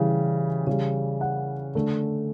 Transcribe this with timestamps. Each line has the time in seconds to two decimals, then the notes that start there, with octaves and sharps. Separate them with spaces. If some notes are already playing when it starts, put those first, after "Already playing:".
Already playing: C#3 E3 G3
0.67 C#3 G3
1.21 F#5
1.75 D3 A3